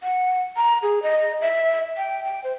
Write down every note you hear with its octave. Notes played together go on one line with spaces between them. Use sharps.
F#5
A#5
G#4
D#5
E5
G5
G5
C5